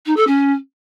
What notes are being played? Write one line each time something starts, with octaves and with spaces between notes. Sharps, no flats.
D#4
A4
C#4